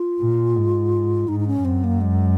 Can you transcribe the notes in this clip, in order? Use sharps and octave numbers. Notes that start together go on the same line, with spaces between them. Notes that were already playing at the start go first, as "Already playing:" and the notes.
Already playing: F4
A#2
G#2
G#2 D#4
D#4
C#4
F#2 C4
A#3
G#3